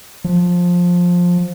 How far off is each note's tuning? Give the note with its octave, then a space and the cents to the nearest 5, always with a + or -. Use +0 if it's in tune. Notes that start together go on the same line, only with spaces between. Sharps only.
F3 +15